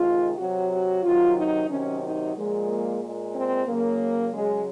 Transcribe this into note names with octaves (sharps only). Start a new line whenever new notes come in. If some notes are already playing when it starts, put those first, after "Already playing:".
Already playing: C3 D#3 G#3 F4
C3 F#3 F#4
F#4
C3 D#3 F#3 F4
D#4
C3 D#3 F#3 C#4
D#4
A#2 F3 G#3
A#3
A#2 G#3
C4
C#3 F#3 A#3
C#3 F#3 G#3